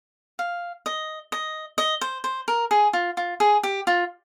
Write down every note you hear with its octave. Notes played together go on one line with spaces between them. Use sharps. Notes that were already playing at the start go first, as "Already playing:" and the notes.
F5
D#5
D#5
D#5
C5
C5
A#4
G#4
F4
F4
G#4
G4
F4